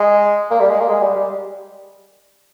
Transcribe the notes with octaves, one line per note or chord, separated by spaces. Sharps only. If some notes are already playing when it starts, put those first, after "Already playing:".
Already playing: G#3
A#3
G3
G#3
A#3
G#3
G3
G3